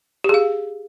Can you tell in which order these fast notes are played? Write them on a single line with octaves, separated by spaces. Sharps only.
G4 G#4 F5